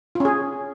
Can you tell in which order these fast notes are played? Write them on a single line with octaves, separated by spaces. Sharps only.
F4 C#4 G#4